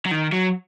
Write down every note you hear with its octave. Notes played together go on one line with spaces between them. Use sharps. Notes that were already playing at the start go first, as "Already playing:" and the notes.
F#3
D#3
F#3